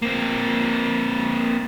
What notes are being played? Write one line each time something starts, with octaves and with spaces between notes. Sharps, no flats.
A#3 C4